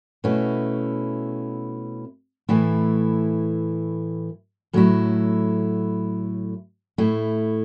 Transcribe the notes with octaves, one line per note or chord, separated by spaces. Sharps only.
B2 A3 C#4 E4
A2 E3 A3 E4
A2 F#3 A3 E4
A2 A3 E4